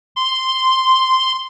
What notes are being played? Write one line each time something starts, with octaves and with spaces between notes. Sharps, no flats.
C6